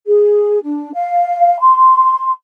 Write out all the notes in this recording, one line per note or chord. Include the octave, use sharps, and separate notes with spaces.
G#4
D4
F5
C6